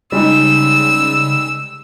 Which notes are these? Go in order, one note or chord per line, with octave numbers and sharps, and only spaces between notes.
C#3 G3 G#3 D#4 E6